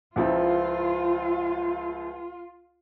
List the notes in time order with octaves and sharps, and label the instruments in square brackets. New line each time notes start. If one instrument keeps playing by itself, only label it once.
[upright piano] C#2 F3 E4 [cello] F4